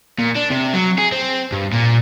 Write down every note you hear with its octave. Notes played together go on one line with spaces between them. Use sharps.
A#2
D4
C3
F#3
G#4
C4
G2
A#2